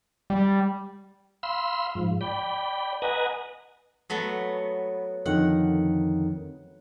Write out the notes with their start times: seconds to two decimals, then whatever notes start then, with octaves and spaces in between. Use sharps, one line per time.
0.30 G3
1.43 F5 B5 C6 E6
1.95 G#2 F3
2.21 D5 G5 B5
3.02 B4 D#5 F#5 G#5 A#5
4.10 F#3 A3 B3
5.26 F2 D3 D#3 F#5